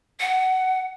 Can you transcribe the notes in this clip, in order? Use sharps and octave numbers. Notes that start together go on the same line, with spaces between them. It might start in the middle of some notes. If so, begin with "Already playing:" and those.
F#5